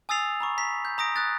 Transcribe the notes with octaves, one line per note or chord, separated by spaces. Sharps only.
G#5 D#6 E6 A6 C7 F7
A#5 B5 C#6
A#5 B6
G6
A#5 D#6 A#6 D7
D#6 F#6 A6